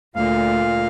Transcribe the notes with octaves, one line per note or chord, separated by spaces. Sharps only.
D2 A#2 F5